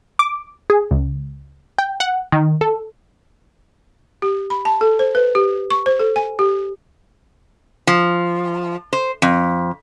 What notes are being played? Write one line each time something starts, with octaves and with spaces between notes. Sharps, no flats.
D6
G#4
C#2
G5
F#5
D#3
A4
G4
B5
A5
A4
C5
B4
G4
C#6
C5
A4
G#5
G4
F3
C5
F2